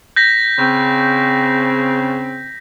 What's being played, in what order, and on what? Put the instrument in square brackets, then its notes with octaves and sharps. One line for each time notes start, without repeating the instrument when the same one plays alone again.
[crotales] G6 A#6 B6
[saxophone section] C#3 C4